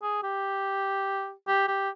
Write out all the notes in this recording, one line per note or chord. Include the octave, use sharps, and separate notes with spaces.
G#4
G4
G4
G4